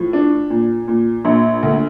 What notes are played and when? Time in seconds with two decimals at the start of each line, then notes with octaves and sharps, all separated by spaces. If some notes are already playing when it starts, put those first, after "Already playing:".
Already playing: A2 F3
0.13 D4
0.50 A#2
0.88 A#2
1.25 A#1
1.63 D2